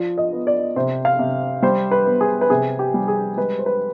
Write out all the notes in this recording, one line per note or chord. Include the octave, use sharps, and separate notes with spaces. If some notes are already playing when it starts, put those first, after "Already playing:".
Already playing: F3 D5
D#5
B3
D5
C3 C5
F5
C3
G3 C5
B4
B3
G#4
B4
C3 G#4
G4
G3
G#4
G#3 B4
C5
B4